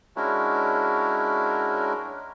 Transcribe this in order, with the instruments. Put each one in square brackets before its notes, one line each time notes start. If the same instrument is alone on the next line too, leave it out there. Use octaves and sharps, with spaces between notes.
[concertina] G#3 C#4 D4 E4 F#4 A#4